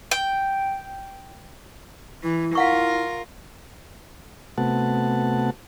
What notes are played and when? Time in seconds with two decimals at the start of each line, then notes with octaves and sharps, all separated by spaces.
0.11 G5
2.23 E3 E4
2.55 F4 A#4 F5 F#5 C#6
4.58 C3 A3 B3 F#4 F#5 A5